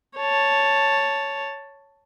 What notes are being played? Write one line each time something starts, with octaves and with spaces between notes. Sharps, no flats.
C#5 A5